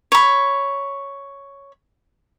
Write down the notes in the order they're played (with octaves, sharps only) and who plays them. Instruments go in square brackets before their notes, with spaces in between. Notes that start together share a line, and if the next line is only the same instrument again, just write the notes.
[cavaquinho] C#5 B5